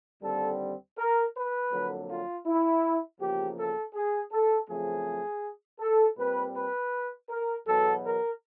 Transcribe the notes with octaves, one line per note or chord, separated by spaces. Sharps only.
D#2 D3 G3 C4 A4
A#4
B4
F2 D3 F#3 A#3
F4
E4
E2 C#3 F3 A#3 G4
A4
G#4
A4
F#2 C#3 F3 A3 C4 G#4
A4
A#2 G3 C4 B4
B4
A#4
E2 B2 F#3 B3 A4
A#4